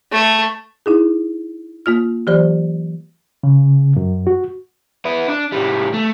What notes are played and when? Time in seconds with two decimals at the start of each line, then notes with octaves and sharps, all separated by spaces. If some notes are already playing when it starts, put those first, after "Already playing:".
0.12 A3
0.86 D#4 E4 G#4
1.86 A#3 F4 F6
2.27 E3 F#3 G4 C5 D5
3.43 C#3
3.96 F#2
4.27 F#4
5.05 B3 E4
5.29 D4
5.52 A2 G3
5.94 A3